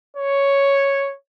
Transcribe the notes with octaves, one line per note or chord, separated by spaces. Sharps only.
C#5